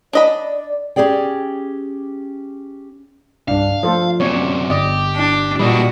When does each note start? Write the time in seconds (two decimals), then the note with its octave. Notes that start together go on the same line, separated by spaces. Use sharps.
0.13 D4 D5 D#5 B5
0.96 C#4 D#4 G4 G#4 D5 G5
3.48 C2 G2 D4 F5
3.83 F3 A3 F4 A4 C5
4.20 F#2 C3 B3 C#4 C#5 D5
4.70 G1 G4 D5 D#5
5.16 D4
5.59 A#2 E3 G3 D4 F#4 D#5 B5